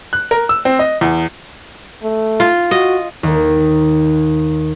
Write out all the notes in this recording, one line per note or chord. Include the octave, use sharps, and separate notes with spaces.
F#6
A#4
E6
C4
D#5
E2
A3
F4
F#4 D#5
D#2